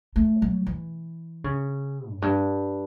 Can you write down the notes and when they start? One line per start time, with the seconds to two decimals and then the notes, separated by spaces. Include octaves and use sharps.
0.16 A3
0.42 F#3
0.67 E3
1.44 C#3
2.11 F#2
2.22 G2